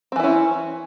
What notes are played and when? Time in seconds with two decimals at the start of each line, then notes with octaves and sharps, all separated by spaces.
0.12 C4
0.16 E3
0.20 E4
0.23 C#4